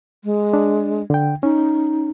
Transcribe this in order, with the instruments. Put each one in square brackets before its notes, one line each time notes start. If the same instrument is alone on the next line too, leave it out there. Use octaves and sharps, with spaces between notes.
[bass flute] G#3
[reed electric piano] D4
D3 G5
[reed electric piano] C#4 [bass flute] D#4